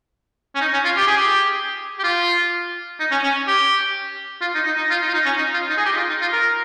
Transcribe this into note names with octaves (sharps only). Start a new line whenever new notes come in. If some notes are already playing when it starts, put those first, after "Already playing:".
C#4
D#4
C#4
F4
G4
G#4
G4
G4
F4
D#4
C#4
C#4
G4
F4
D#4
D#4
D#4
F4
D#4
F4
D#4
C#4
D#4
F4
D#4
G#4
G4
D#4
F4
D#4
F4
A#4